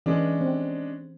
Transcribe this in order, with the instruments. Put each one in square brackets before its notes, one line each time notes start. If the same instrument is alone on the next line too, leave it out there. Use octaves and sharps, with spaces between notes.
[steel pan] E3 [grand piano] G#3 C#4 D4
[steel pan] C4